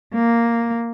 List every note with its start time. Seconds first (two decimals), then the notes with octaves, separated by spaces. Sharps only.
0.14 A#3